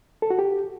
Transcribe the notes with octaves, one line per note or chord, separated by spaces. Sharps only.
A4
F#4
G4